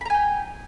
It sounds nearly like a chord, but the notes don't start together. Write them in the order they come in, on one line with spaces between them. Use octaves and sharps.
B5 A#5 G#5 G5